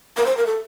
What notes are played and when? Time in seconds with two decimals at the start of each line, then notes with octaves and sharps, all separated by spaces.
0.17 A#4
0.26 C5
0.37 A#4
0.46 A4